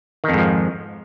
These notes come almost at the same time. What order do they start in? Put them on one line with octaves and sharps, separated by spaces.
D#3 F2 G#2 F3